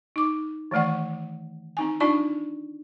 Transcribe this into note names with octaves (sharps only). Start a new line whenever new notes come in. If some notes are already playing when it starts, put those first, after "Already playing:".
D#4 D6
D#3 E3 A3 D5 F#5
C4 D#4 G#5
D4 D#4 F4 D5 A5 C#6